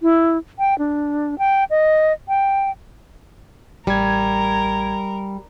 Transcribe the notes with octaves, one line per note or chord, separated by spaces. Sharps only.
E4
G5
D4
G5
D#5
G5
A1 G3 A#4 G#6